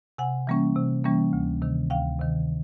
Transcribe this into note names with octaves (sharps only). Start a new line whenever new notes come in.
C3 F#5 G#5
E3 G3 A#3 C#4
C3
E3 G3 A#3 C#4
D2
C3 D#3
D2 F5 G5
C3 D#3